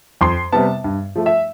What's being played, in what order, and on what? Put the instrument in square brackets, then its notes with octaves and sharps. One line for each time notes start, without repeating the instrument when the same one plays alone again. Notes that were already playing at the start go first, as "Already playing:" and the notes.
[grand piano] F2 C6
C3 G3 B3 A5
G2
F3 A3
E5